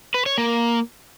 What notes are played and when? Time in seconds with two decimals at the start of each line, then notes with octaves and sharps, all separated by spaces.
0.14 B4
0.26 C#5
0.38 A#3